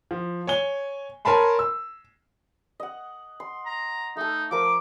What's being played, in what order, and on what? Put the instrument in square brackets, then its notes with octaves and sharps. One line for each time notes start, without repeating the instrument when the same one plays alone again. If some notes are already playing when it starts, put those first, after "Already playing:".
[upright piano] F3
C#5 G#5 G7
A#4 C#5 G#5 A5 B5 C6
E6
[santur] D#5 F#5
C6
[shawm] A#5
[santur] A3 A4 [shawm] D#4
[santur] F3 A#4 C#6 [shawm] D6